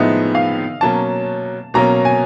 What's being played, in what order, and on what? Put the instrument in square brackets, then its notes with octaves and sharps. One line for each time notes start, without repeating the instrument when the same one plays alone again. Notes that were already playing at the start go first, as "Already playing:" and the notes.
Already playing: [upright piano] A2 F3 G#3 B3 D#4 [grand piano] D#5 E5
[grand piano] F5
[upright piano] B2 F#3 A#3 C#4 [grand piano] A5
[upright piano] B2 F#3 A#3 C#4 [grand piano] A#5
[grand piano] G#5